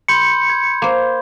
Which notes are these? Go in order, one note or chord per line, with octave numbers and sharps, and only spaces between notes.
B5 C6 G6 C#7
G#6
A#3 C5